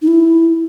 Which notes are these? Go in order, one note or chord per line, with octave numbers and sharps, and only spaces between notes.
D#4
E4